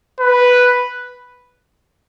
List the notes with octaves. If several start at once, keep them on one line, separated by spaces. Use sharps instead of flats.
B4